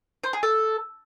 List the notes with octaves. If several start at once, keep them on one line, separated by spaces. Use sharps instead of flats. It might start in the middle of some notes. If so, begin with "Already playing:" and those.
C5
G#4
A4